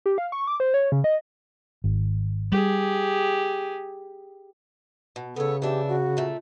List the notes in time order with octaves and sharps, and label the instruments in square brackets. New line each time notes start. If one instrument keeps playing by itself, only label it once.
[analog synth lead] G4
F5
C#6
D6
C5
C#5
C#3
D#5
[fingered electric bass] G#1
[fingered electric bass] G3 [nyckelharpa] G4 G#4
[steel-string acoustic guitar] B2
[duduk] C#3 [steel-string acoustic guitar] B3 C#5 [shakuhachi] A4
[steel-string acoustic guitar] E3 D4 E5 [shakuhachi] G4
[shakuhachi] F#4
[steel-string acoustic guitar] A#2 A3